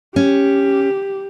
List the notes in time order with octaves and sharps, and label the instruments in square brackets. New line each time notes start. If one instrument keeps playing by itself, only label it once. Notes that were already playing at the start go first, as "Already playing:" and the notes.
[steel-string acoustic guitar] C#4 [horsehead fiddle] G4